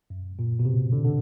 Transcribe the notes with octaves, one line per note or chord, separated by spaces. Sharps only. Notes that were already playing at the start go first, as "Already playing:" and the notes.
F#2
A#2
B2
C3
D3
D3